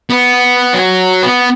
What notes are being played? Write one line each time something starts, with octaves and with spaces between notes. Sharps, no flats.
B3
F#3
B3